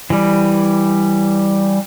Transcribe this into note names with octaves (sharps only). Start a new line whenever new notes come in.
E3 G3